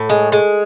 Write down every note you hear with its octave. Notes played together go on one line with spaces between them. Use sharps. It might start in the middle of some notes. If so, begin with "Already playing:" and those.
Already playing: A2
G#3
G#3